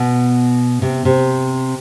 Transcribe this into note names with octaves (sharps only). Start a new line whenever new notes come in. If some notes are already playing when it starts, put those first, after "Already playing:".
Already playing: B2
C3
C3